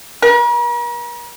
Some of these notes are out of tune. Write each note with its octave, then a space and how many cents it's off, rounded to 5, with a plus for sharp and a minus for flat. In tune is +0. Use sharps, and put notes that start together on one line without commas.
A#4 +45